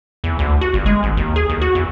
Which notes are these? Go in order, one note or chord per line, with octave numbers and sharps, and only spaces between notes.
E2
D2
F#4
G1
G#3
G#1
D#2
G#4
D#2
F#4
E2